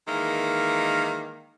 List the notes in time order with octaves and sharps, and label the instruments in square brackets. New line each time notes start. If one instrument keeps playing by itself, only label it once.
[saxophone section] D#3 E3 G#3 A#3